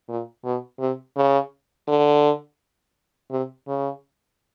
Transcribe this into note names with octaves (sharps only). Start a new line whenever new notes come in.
A#2
B2
C3
C#3
D3
C3
C#3